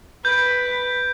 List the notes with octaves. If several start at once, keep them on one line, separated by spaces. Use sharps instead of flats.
B4 G6 D7